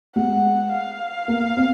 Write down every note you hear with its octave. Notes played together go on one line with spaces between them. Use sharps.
G#3 F#5
F5
A#3
C4